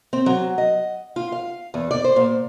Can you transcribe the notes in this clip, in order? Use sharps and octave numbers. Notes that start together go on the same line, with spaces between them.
C4
F#3
D#5
F4
F5
E2
D5
C5
A#2